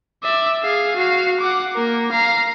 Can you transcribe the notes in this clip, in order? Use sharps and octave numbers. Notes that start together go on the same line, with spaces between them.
D5 E5
G#4 F5
F#4 F5
F#5 D6
A#3 A#4
F5 A#5